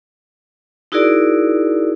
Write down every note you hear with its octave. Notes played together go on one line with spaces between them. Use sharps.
D#4 E4 F#4 G#4 A#4 D5